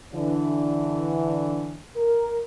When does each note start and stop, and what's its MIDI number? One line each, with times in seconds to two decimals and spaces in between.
0.14 1.80 50
0.14 1.80 52
0.14 1.80 62
1.96 2.41 70